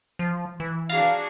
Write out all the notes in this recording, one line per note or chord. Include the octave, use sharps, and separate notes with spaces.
F3
E3
D4 F#4 G#4 F5 A#5 A6